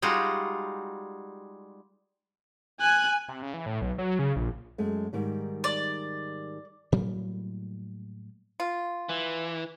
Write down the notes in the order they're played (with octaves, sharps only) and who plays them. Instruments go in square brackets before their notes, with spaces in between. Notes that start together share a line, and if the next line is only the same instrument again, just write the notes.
[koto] G3 G#3 D#4 F4 F#4
[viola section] G#5 [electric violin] F#6
[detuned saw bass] C3
C#3
E3
A2
B1
F#3
C#3
A#1
[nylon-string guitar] F#2 G#3 A3
G#2 D#3 G3
[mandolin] D5
[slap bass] A2 F#3 G3 A#3
[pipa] F4
[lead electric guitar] E3